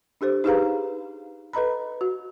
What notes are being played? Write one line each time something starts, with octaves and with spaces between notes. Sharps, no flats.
D4 G4 A4 C5
D#4 G4 G#4 B4 F5 A#5
A4 B4 D#5 A#5 B5
F#4